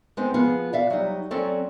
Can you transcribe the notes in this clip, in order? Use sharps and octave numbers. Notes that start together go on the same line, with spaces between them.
G#3 B3 C4 D#4
F3 B3 F4 G#4
D5 E5 F5
F#3 G3 D#4
F#3 C4 C#4 A4 D5